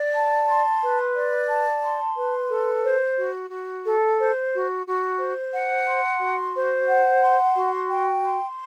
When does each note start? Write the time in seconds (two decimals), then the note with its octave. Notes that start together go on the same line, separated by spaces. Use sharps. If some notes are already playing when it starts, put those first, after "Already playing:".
Already playing: D5
0.14 A5
0.47 C6
0.82 B4
1.15 D5
1.49 A5
1.83 C6
2.16 B4
2.50 A4
2.83 C5
3.18 F#4
3.50 F#4
3.85 A4
4.19 C5
4.52 F#4
4.86 F#4
5.19 C5
5.54 F#5
5.87 C6
6.21 F#4
6.54 C5
6.89 F#5
7.22 C6
7.55 F#4
7.89 G5
8.24 C6